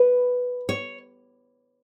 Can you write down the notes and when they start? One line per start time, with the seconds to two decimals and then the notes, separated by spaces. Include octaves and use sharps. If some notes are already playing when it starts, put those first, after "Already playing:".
Already playing: B4
0.69 C#5